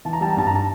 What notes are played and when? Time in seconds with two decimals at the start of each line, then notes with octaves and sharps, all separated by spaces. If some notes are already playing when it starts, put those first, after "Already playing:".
0.05 E3 A5
0.13 A#5
0.21 G3 A5
0.30 A#5
0.37 G2 A5
0.47 A#5
0.55 A5